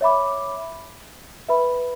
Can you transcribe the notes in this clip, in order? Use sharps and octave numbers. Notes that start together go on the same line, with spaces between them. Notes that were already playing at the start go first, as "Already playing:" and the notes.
C#5 E5 B5 D6
B4 E5 B5